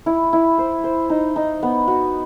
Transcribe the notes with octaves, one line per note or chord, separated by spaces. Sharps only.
E4
E4
C5
C5
D#4
D#4
B3
F#4